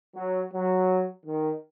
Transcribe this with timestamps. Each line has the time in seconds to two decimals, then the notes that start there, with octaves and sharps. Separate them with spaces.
0.15 F#3
0.52 F#3
1.25 D#3